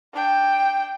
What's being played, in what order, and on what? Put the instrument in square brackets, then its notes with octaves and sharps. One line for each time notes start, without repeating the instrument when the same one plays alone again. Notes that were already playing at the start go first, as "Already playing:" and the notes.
[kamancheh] D4 G5